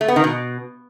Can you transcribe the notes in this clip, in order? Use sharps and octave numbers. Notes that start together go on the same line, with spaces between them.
A3
B3
D#3
B2